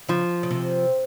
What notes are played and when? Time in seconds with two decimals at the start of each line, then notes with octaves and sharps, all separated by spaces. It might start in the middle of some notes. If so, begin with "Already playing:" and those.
0.08 C#3 F3
0.43 C#3
0.50 C3